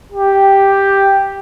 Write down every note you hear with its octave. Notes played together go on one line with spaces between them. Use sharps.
G4